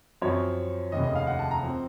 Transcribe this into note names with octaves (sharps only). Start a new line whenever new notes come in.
F#2 F3 C4 C#5
F1 D#2 C#3 D#5
D#5
F5
F#5
A5
A#5
F3 C4